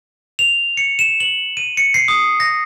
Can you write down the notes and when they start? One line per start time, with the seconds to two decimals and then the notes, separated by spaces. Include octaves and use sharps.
0.39 F7
0.77 C#7
0.99 E7
1.20 F#7
1.57 D#7
1.77 C#7
1.94 C7
2.08 D#6
2.40 A#6